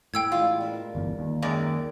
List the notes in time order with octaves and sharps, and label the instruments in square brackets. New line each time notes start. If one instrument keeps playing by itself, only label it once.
[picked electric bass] A2 [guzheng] B3 G4 [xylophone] G5 E6 G#6
[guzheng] E3 G3 G#3 [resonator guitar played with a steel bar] F4
[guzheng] D4 A#4 E5
[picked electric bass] G1 E2
D#2
[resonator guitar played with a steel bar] F#2 G#3 D5 [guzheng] D#3